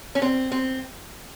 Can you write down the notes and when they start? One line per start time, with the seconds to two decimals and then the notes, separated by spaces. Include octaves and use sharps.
0.15 C#4
0.22 C4
0.52 C4